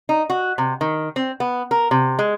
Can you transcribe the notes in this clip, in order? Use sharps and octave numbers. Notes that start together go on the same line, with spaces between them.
D#4
F#4
C3
D#3
C4
B3
A#4
C3
G#3